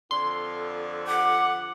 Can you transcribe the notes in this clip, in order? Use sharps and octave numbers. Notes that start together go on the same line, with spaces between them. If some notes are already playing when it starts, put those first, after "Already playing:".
F2 D3 C6
F#5 D6